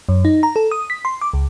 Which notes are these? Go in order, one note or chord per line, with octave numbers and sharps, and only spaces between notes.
F#2
D#4
A#5
A4
D#6
B6
C6
D6
C#2